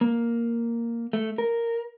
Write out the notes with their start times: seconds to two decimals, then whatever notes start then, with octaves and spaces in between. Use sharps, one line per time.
0.01 A#3
1.13 A3
1.38 A#4